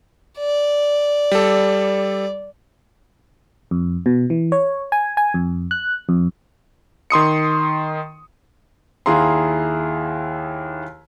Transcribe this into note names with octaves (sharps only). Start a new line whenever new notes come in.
D5
G3 A4
F2
B2
E3
C#5
G#5
G#5
F2
F#6
F2
D#3 C6 D#6 C#7
D#2 E4 G#4 F5 A#5 C6